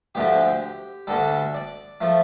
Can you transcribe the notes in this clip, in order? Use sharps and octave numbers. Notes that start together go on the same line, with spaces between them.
D2 D3 F3 A3 G4
D2 D3 G3 A4
D5
F3 A3